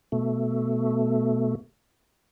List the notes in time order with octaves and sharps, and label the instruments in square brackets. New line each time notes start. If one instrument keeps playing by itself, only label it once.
[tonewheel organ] B2 A3